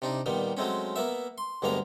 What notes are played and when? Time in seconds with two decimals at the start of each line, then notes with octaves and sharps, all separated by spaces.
0.02 C3 D4 D#4
0.26 A#2 D#3 G3 B3
0.57 F#3 G#3 A3 C4 C#4
0.96 A#3 B3 E5
1.38 C6
1.62 D2 G2 G#3 A#3 B3 F5